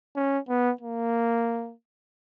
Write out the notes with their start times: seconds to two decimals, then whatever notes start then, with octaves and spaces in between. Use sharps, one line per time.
0.16 C#4
0.49 B3
0.81 A#3